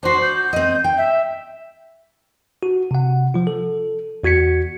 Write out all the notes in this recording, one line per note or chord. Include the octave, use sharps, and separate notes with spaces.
D4 F#4 C5
G6
C4 D#5
G5
E5
F#4
C3 F#5
F3 F4
A4
E2 F#4 G#6 B6 C#7